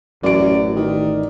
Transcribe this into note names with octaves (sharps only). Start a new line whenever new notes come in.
A1 F#2 D5 D7
D#3